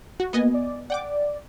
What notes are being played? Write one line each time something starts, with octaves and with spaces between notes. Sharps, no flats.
F#4
A#3 B3 D#5 G#5
D5
D5 F#5 G5 D6